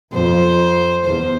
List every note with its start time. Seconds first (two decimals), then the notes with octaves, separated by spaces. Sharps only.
0.13 F2 C5
1.04 E2 C5